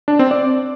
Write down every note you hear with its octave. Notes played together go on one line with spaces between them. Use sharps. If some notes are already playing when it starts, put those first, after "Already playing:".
D4
C4
D5